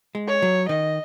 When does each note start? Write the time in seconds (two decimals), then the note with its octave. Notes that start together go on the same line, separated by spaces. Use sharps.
0.15 G#3
0.28 C#5
0.42 F#3
0.68 D#3 D#5